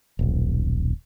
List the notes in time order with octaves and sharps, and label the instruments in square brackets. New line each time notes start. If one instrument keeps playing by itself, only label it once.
[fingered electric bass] D#1 B1